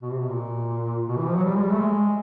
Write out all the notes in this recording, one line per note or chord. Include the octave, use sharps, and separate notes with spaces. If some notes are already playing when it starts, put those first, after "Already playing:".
B2
C3
B2
A#2
B2
E3
F3
F#3
G3
G#3
G3
A3
G#3